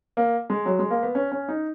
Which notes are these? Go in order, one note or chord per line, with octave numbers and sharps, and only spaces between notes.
A#3
G#3
F#3
G#3
A#3
B3
C#4
C#4
D#4